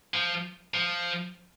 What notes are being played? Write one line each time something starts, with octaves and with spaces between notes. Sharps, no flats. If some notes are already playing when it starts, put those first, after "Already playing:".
F3
F3